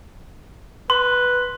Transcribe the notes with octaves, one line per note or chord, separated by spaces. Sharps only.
B4 C6